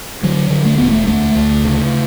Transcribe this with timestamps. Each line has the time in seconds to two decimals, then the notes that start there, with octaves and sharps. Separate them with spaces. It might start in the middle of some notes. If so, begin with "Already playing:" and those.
0.23 D3 F#3
0.51 D3
0.65 A3
0.78 E1 B3
0.91 A3
1.07 D2 A3
1.35 D2
1.64 C#3